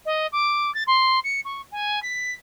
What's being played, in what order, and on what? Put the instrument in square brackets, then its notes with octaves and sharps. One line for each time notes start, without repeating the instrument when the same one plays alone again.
[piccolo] D#5
D6
A6
C6
C#7
C#6
G#5
B6